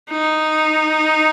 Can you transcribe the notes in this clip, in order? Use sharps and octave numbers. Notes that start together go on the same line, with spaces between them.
D#4